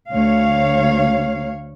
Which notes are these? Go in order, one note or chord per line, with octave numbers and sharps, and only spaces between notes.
D2 C#5 F5